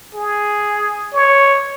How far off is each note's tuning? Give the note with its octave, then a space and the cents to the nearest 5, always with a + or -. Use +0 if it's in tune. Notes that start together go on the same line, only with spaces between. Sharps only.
G#4 +0
C#5 +0